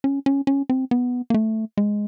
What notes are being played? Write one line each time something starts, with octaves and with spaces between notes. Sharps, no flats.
C#4
C#4
C#4
C4
B3
A#3
A3
G#3